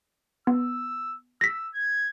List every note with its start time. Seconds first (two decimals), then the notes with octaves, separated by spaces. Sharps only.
0.47 B3 E6
1.41 E6 A#6 B6
1.74 G#6